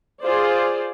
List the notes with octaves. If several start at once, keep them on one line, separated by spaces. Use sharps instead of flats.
F4 G#4 C5 D5